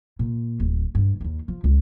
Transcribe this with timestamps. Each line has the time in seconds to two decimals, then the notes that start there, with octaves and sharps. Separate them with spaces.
0.19 A#2
0.60 D1
0.95 G2
1.21 D#2 D#3
1.48 F3
1.64 C#2